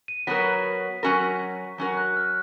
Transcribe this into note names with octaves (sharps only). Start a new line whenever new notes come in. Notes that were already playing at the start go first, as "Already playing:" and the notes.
D#7
F#3 B3 F#4 A#4 B6
F#3 C#4 F#4 A#4
F#3 C#4 F#4 A#4
F#6
F6